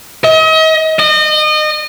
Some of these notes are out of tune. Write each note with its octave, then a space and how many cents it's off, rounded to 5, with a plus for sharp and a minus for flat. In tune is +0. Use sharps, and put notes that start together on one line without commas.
D#5 +40
D#5 -30